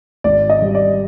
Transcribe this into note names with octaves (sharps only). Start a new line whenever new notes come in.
G#1 D5
D#5
G3
D5